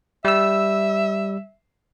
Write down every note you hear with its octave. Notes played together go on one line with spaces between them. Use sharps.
G3 E5 E6